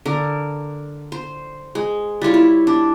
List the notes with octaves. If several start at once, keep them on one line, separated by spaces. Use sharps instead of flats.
D3 A#4
C5
G#3
G3 E4 F4 C#5
E4
D4